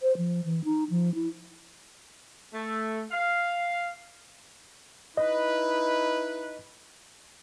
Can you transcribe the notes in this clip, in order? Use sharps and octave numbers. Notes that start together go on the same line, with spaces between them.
C5
F3
E3
D#4
F3
E4
A3
F5
D#4 E4 B4 D#5